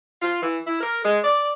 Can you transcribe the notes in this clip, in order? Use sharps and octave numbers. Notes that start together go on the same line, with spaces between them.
F4
E3
E4
A#4
G#3
D5